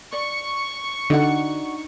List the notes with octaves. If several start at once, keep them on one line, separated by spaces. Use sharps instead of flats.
D5 C#6
D3 D4 D#4 F#4 D5 D#5 F#5